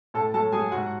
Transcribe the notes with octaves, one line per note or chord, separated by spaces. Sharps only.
A2 A4 A5
F#3 A4 A5
F#3 G#4 G#5
G#2 F#4 F#5